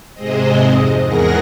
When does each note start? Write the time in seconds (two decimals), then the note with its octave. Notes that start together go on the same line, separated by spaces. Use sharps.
0.14 G#2 C3 G#3 C4 C5 D#5
0.70 F2
1.03 E2 G#2 G#4 A#4 F#5 A#6